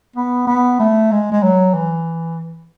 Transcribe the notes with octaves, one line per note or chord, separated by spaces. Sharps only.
B3
B3
A3
G#3
G#3
F#3
E3